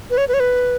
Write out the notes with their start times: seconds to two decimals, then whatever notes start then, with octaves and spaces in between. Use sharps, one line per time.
0.10 B4
0.18 C#5
0.28 B4
0.34 C#5
0.40 B4